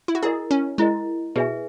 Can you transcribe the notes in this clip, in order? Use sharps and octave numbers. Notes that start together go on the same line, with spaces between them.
E4
F#4
E4 G#4 A#4 D#5
C#4
G#3 E4 A#4 D#5
B2 G#4 B4 E5 G#5